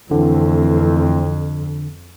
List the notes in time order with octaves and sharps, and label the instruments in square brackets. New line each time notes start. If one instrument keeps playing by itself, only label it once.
[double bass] F2 [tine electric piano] D3 [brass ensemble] E3 A3 C4